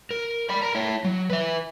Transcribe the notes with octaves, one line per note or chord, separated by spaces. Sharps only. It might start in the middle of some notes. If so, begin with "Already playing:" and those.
A#4
D5 B5
A#4 A#5
E4 C#5
F#3
B4 E5